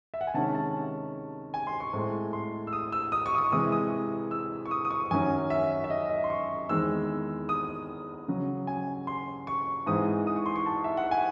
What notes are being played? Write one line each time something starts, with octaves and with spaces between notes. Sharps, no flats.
E5
F#5
G#5
C3 D#3 G#3 C#4 A5
A5
G#5
C6
C#6
A2 G#3 C4 C6
C6
E6
D#6
E6
D#6
C#6
D#6
C#6
C3 E3 G#3 D#6
D#6
E6
C#6
D#6
D#6
C#6
F#2 D#3 F#3 C#4 G#5
E5
E5
D#5
E5
C6
C#6
E2 D#3 G#3 C4 E6
D#6
C#3 F#3 C#4
G#5
C6
C#6
G#2 E3 G#3 C4 D#6
D#6
C#6
C6
C#6
A5
E5
F#5
G#5